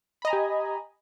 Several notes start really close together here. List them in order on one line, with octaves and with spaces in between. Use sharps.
B5 D#5 A#5 G#5 G4